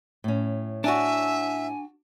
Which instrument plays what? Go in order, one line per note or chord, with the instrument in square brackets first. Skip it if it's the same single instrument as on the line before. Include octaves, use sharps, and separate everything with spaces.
[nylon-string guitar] A2 C#4
[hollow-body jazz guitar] D4 F#4 [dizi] E5 [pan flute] G#5